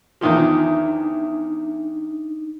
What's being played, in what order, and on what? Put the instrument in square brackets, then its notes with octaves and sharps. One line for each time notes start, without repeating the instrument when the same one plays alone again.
[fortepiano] E2 D#3 F3 [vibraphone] D4 D#4